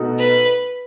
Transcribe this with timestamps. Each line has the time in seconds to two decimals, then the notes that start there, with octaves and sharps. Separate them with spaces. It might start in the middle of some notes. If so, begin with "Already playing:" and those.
Already playing: B2 A3 D#4 F#4
0.19 B4